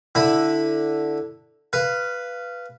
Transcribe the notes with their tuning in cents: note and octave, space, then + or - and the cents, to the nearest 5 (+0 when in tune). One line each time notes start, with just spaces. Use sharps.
D3 +0 E4 +0 B5 +0
B4 +0 F5 -15